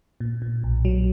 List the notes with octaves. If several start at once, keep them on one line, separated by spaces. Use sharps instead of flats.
A#2
A#2
B1
F#3